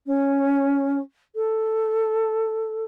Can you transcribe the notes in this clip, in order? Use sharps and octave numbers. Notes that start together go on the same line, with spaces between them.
C#4
A4